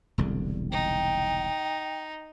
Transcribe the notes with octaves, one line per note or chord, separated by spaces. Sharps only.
E1 C2 D3
D#4 G5